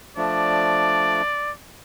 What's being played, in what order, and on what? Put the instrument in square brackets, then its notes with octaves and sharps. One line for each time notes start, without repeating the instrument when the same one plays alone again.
[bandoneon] F3 A3 D4 [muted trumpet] D5